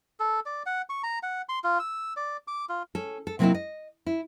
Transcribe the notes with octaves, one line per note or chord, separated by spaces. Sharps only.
A4
D5
F#5
C#6
A#5
F#5
C6
F4
E6
D5
D6
F4
C#4 A4
A4
C3 F#3 A#3 C4 D#4 E4
D#5
E4